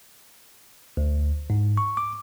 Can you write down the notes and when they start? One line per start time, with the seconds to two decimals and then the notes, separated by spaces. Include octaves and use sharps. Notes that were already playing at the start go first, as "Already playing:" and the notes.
0.97 D2
1.50 G#2
1.77 C#6
1.97 D6